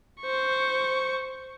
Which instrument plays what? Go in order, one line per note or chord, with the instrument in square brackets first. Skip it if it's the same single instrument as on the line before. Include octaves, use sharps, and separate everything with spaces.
[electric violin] C5 C#6